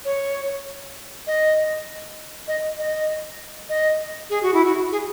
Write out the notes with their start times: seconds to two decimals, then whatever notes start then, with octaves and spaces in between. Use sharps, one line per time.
0.05 C#5
1.27 D#5
2.48 D#5
2.78 D#5
3.69 D#5
4.30 G#4
4.42 F#4
4.54 E4
4.65 F#4
4.92 G#4